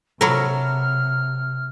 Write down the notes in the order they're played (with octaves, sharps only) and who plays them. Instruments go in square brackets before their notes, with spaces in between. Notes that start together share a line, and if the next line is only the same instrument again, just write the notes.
[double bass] C3 [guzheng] F#3 A#4 [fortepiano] A4 B5 [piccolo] F6